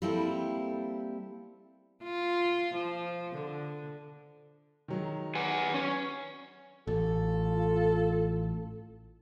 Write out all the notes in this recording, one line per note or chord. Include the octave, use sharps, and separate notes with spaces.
G3 A#3 C4 E4 A4
F4
F3
D3
D#3 F#3 G#3
B4 F#5 G#5
C#4
A1 F4 A4